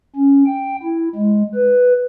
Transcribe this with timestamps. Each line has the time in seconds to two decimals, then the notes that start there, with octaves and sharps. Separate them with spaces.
0.16 C#4
0.46 G5
0.83 E4
1.15 G#3
1.55 B4